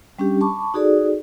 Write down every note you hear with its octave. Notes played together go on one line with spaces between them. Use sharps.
G3 C#4 D4 G4
A5 B5 C#6 D6
D#4 F#4 G#4 A4 D5